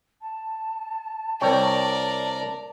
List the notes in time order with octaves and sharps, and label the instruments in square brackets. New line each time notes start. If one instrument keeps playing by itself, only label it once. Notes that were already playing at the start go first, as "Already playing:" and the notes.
[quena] A5
[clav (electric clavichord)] C2 C#5 G5 [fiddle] A#4 D5